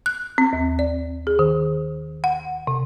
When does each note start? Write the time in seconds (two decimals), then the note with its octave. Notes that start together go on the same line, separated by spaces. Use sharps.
0.06 F#6
0.38 C4
0.53 D#2
0.79 D5
1.27 G#4
1.39 D#3
2.24 F#5
2.67 C3